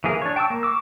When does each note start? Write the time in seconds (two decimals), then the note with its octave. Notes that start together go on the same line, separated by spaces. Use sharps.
0.04 E3 F3 A#3 G#4 A#4
0.22 D4 C#5
0.36 G5 A5 C#6 D6 E6
0.50 A#3
0.63 C#6 D6 E6